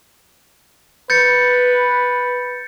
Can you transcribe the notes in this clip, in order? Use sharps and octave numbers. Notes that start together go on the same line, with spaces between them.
B4 G6 A6 C#7